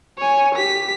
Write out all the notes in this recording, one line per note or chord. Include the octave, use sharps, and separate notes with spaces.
C#5 G#5
G4 B6